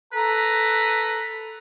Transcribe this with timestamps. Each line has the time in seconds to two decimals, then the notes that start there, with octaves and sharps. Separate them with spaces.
0.13 A4 B4 A#5